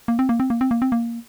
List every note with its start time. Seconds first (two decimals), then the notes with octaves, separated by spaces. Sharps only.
0.08 A#3
0.19 C4
0.29 A#3
0.40 C4
0.50 A#3
0.61 C4
0.71 A#3
0.82 C4
0.92 A#3